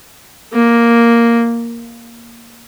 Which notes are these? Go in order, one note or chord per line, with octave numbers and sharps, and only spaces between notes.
A#3